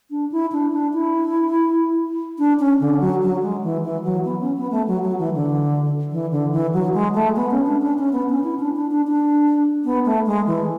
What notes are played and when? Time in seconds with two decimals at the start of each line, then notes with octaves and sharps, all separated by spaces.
0.11 D4
0.32 E4
0.52 D4
0.73 D4
0.93 E4
2.38 D4
2.60 C#4
2.80 D3
3.00 F#3
3.22 F#3
3.42 G#3
3.64 E3
3.83 E3
4.04 F#3
4.25 B3
4.41 C#4
4.56 B3
4.71 A3
4.87 F#3
5.03 F#3
5.19 E3
5.34 D3
6.12 E3
6.32 D3
6.52 E3
6.73 F#3
6.94 G#3
7.14 A3
7.36 B3
7.51 C#4
7.66 D4
7.82 D4
7.98 C#4
8.13 B3
8.29 C#4
8.44 E4
8.59 D4
8.76 D4
8.91 D4
9.07 D4
9.85 B3
10.05 A3
10.26 G#3
10.47 E3